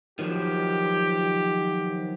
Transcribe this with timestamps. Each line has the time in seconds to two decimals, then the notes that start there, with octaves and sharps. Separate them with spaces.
0.19 D#3 F3 F#3 G4